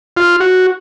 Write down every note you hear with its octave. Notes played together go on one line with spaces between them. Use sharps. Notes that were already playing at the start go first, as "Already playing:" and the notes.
F4
F#4